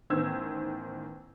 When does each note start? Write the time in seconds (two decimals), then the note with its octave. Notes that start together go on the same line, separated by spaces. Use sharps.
0.10 A1 D#3 B3 C5 E6 G#6